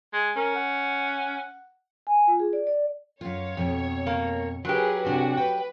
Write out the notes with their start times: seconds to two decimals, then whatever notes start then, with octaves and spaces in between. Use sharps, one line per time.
0.13 G#3
0.36 C#4 A#4
0.55 F#5
2.07 G#5
2.27 F4
2.40 G#4
2.53 D5
2.67 D5
3.21 F#2 F4 C#5
3.57 F2 B2
4.07 A#3
4.65 F#3 G4 G#4 A#4 B4
5.04 C3 D4 F#4 G#4
5.37 B4 G5